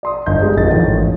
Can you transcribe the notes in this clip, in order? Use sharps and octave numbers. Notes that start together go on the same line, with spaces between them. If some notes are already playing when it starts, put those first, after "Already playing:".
D5 C6 D#6
G1 D#5 G6
G#3 D4 G4
G#1 F2 D4 A4 D#5 A6
A1